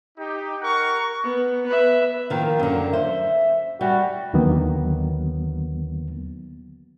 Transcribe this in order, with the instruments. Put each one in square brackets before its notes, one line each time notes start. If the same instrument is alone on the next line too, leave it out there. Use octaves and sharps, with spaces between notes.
[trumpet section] D#4 G4
A#4 F#5 A#5 C#6
[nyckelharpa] B3
B4 E5
[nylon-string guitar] D#3 F3 [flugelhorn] A#3
[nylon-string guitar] F#2 D3
[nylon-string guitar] C5 [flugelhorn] E5
[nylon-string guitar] G3 [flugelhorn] F#4
[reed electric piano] D#2 D3 D#3 F#3 A#3 B3